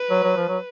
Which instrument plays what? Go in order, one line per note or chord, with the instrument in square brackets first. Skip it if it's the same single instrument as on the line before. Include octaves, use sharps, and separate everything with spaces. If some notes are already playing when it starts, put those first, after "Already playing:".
Already playing: [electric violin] B4
[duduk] F#3
F#3
F3
F#3